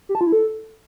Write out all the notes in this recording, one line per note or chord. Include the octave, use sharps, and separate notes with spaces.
G4
A5
F4
E4
A4